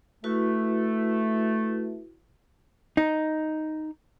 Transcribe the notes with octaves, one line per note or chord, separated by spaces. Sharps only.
A3 E4 F#4 B4
D#4